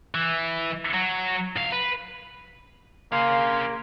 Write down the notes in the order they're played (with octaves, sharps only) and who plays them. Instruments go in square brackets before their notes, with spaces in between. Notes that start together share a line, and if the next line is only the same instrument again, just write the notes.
[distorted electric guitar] E3
F#3
B1 F5
B4
[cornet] A#3 [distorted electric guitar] G#4 F5 [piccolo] C6